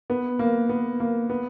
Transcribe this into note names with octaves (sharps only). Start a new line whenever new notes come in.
B3
A#3
B3
A#3
B3